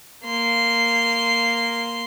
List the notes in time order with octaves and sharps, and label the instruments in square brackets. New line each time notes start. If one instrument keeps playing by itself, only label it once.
[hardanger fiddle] A#3 C6